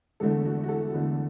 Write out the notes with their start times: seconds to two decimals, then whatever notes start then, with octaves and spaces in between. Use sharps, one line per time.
0.20 E2 D3 A3 A4
0.45 F#4
0.63 F#4
0.69 A4
0.93 E2 D3 A3